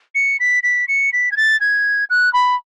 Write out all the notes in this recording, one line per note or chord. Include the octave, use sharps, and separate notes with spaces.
C#7
B6
B6
C#7
B6
G#6
A6
G#6
F#6
B5